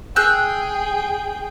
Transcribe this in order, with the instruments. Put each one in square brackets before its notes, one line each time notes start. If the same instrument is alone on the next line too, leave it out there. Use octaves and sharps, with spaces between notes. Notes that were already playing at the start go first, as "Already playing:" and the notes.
[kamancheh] G#4 G5 [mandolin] E6 F#6 G6